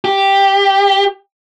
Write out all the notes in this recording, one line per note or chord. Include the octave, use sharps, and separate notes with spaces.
G4